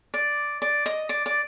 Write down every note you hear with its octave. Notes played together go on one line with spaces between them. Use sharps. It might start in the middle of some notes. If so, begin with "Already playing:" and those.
D5
D5
D#5
D5
D5